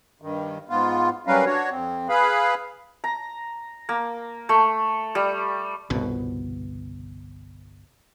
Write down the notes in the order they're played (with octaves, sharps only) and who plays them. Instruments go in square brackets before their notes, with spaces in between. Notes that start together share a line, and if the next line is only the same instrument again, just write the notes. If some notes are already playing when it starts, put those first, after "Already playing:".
[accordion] G2 D#3
G#2 B3 F4
F#3 G3 C#4 A#4 B4 F5
D4 F#4 C#5
F2 C4
G#4 B4 F5 B5
[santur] A#5
A#3
A3
G3
[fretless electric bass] G1 C2 B2